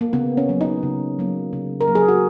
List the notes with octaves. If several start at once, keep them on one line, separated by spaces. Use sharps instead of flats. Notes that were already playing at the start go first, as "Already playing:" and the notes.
A#3
C#3 B3
C#4
F#3 A#3
D#4
C#3
F#3 A#3
C#3
A#4
F#3 A#3
G#4
F#4